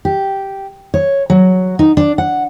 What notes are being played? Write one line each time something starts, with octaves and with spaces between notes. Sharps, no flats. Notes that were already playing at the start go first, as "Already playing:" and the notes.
G4
C#5
F#3
D#4
D4
F#5